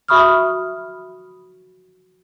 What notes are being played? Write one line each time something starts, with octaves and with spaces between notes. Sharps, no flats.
F#4 E5 B5 C#6 D#6 F6